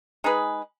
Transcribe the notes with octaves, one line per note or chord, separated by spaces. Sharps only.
G#3 D#4 G#4 B4